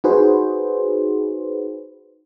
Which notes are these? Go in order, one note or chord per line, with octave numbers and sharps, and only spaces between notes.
D#4 F#4 G#4 B4 C5